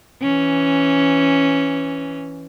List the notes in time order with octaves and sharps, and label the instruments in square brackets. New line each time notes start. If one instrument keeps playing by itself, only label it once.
[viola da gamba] E3 C#4